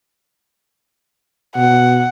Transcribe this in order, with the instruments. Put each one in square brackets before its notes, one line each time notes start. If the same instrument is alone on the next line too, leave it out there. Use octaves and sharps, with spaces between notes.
[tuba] B2 [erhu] F#5